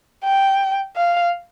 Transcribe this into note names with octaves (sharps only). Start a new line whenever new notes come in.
G5
F5